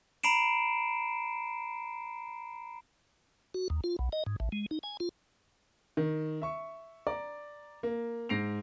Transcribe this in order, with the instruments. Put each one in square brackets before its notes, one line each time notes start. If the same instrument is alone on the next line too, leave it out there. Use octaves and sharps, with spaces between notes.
[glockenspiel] A#5 B5 C7 D7 E7
[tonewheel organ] F#4
D#2
F4
B1
D#5
G#2
A1
G#3
D#4
G#5
F4
[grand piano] D#3
E5 C#6
D5 A#5 D6
A#3
G#2 A#6 C7 D7 F7